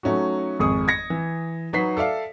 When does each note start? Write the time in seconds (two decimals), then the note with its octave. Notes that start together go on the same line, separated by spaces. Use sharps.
0.03 F#3 A3 C#4 D#4 F#4
0.59 G#1 F2 G#4 C#6 D#6
0.88 G#6 A#6 C#7
1.10 E3
1.73 F#3 D#4 F#4 B4 B6 C7
1.97 A4 D5 E5 F5